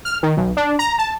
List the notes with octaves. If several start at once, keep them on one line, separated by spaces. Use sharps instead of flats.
F6
D#3
B1
D4
A#5
A5